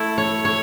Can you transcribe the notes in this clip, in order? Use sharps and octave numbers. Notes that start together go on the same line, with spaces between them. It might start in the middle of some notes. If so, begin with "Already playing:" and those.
Already playing: A3 E4
C#5
C#5